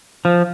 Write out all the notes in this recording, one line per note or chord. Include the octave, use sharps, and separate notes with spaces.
F3